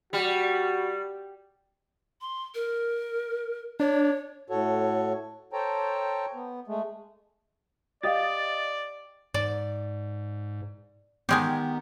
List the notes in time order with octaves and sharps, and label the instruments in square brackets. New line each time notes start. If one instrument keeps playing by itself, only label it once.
[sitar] G3 [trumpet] F#4
[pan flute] C6
A#4
[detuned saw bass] D4 [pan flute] C#5
[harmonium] A2 F#4 A4 C#5
A4 C5 C#5 G5 A5 A#5
B3
G#3 A3
[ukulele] G4 F5 [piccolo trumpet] D5 [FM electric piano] D#5 D#6 A6
[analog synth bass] G#2 [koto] D5
[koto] D#3 G#3 G4 [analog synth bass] B3